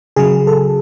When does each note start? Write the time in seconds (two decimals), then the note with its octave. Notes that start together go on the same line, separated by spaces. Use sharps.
0.16 C#3 F#3 G#4
0.47 A4